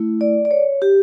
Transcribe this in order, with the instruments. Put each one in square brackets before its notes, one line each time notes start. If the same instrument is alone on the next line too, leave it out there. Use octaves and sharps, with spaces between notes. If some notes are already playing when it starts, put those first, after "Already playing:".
Already playing: [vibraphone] A3 E4
D5
D5
C#5
G4